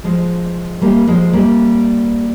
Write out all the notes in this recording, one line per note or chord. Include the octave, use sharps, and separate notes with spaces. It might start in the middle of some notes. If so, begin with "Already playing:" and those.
F3 G#3
G3 A#3
F3 G#3
G3 A#3